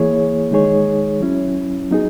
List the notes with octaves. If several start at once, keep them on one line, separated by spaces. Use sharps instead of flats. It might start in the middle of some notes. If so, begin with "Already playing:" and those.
Already playing: E3 A#3 E4 G#4 C#5
D#3 G#3 D#4 G#4 C#5
F#3 C#4 E4
F#3 B3 D#4 G#4